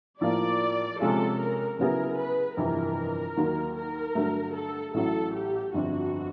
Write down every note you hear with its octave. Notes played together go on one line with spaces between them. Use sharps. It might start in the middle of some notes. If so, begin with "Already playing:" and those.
A2 F3 A#3 D5
C3 F3 G#3 C#4 F4 A4
A#4
C#3 F#3 B3 E4 G#4 A#4
B4
G1 F2 C3 E3 A#4
D#2 D#3 F#3 A#3
A#4
G2 D3 F#3 A3
A4
A1 A2 F#3 A4
G4
G1 F2 D3 F#4